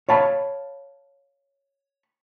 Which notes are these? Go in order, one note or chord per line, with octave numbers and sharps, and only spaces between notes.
C#5 F5 A5 B5